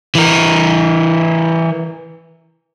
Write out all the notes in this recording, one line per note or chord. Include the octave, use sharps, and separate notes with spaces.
E3 A#4